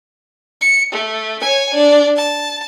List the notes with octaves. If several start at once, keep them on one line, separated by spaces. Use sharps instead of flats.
C#7
A3
C#5 G#5
D4
A5